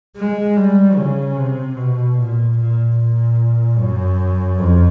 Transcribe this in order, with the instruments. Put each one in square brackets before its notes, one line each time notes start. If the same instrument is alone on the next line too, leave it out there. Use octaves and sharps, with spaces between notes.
[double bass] G#3
G3
C#3
C3
B2
A#2
A#2
A#2
F#2
F2